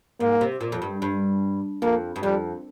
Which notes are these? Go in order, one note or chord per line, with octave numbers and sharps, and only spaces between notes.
G#2 A#3
C3
A#2
F2
G2
G2
F2 A#3
G2
F2 G3